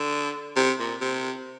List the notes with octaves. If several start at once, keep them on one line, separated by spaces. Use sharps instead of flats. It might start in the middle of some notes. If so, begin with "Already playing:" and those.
Already playing: D3
C3
A#2
C3